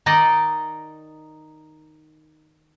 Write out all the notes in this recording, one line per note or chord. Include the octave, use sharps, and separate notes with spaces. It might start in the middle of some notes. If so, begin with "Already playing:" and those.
D#3 D#4 D5 D#5